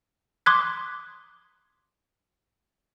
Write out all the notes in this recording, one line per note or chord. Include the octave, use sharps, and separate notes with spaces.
C6 D6 D#6 F#6 G#6 B6